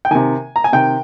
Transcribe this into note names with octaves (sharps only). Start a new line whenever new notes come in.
G5
C3 D#3 G#5
A#5
G#5
C3 D#3 G5